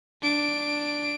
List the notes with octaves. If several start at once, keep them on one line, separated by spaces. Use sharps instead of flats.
D4 D7